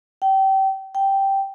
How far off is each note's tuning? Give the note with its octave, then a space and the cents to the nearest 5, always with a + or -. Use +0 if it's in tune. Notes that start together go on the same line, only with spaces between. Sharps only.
G5 -30
G5 -5